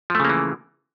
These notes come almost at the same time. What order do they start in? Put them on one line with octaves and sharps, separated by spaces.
F3 A3 C#3 A#3 E3